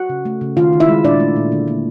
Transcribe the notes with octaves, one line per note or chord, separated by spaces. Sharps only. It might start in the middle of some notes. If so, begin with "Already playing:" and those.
Already playing: F#4 F#5
C#3
A3
C#3
D#3 F4 F5
D#3
E4 E5
G#3
A#2 D4 D5
A3
A#2
D3
A#3